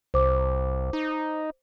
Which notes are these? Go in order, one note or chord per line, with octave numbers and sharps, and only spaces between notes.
C2 C5 D6
D#4